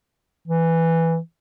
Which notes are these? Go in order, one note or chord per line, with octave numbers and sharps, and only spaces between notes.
E3